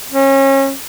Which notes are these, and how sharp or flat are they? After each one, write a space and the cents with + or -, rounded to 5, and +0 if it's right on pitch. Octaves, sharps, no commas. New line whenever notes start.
C#4 -30